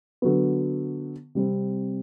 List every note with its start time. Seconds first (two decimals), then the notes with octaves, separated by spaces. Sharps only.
0.22 D3 F#3 B3
1.35 C3 G3 C4